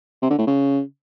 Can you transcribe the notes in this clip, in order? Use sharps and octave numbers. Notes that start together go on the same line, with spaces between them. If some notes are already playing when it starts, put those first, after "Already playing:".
C3
D3
A2
C#3